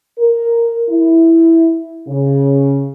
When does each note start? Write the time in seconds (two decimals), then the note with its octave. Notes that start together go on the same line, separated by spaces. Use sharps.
0.19 A#4
0.90 E4
2.07 C#3